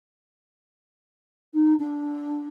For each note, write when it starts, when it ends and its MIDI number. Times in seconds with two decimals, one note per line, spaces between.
1.53 1.73 63
1.79 2.47 62